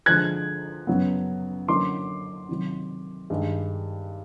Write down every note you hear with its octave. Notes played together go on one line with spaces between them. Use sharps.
D3 F3 G#3 F#6 G#6
F#2 C#3 F#3 B3
D3 F#3 A#3 C#4 C6 D6
C3 D#3 F#3
G2 D#3 G#3